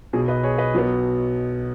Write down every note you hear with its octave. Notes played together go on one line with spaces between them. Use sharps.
B1 B2 F#3 G#4
B4 D#5
G#4 C#5
B4 D#5
B1 B2 F#3 B3